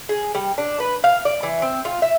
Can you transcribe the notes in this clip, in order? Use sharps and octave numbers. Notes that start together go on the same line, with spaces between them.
G#4
G3
D4
B4
F5
D5
E3
C4
F4
E5